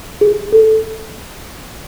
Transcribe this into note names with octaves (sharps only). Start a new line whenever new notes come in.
G#4
A4